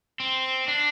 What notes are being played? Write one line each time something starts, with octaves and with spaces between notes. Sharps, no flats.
C4
D4